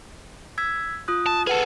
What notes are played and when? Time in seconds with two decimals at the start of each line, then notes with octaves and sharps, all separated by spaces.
0.58 E6 G#6 B6
1.08 F4 D#6 F#6
1.26 A5
1.47 G#4 A4 B4 F#5 A5